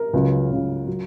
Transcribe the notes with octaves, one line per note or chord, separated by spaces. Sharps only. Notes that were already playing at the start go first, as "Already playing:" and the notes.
Already playing: A#4
C#2 C#3 F#3
C#2 C#3 F#3
F#3